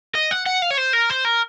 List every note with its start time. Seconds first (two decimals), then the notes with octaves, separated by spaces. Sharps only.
0.15 D#5
0.31 F#5
0.46 F#5
0.62 F5
0.71 C#5
0.78 C5
0.93 A#4
1.10 C5
1.25 A#4